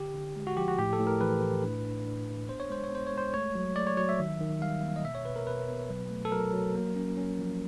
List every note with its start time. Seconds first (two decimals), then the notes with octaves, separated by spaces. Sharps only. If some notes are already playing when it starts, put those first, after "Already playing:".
Already playing: D3 G4
0.14 D3
0.36 G#3
0.47 F#4
0.56 F3 G4
0.68 F#4
0.78 A2 G4
0.93 A4
0.99 A2
1.07 A#4
1.21 E3 B4
1.42 A2
1.63 D4
1.85 D4
2.06 D4
2.27 D4
2.48 B3 C5
2.60 C#5
2.70 G#3 C5
2.84 C#5
2.92 B3 C5
3.07 C#5
3.13 G#3
3.18 C5
3.34 A3 C#5
3.55 F#3
3.76 A3 D5
3.87 C#5
3.97 F#3 C#5
4.09 E5
4.19 D#3
4.41 D#3
4.61 G3 F5
4.83 A#3
4.96 D#5
5.04 B2 E5
5.15 C#5
5.25 B2 B4
5.36 A#4
5.47 B2 B4
5.68 B3
5.90 F#3
6.11 A3
6.25 A4
6.32 F#3 A#4
6.53 F#3
6.75 A#3
6.96 C#4
7.17 C#4
7.39 F3